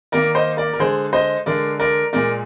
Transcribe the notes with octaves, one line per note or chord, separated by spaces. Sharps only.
D#3 A#3 A#4 D5
C5 D#5
A#4 D5
A#4
D3 G#3 G#4 C5
C5 D#5
D3 G#3 A#4 D5
A#4 D5
A#2 G#3 A#4 D5